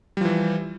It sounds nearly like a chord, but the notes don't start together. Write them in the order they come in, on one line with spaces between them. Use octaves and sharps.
G3 F3 E3